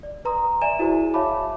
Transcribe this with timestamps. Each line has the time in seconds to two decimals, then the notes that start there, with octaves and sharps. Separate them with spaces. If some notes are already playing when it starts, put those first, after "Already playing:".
0.03 D5
0.25 B4 A#5 C6 D#6
0.62 D5 E5 G#5 D#7 E7
0.79 E4 F#4 G#4 C5 G#5
1.14 C#5 E5 F5 A5 B5 D6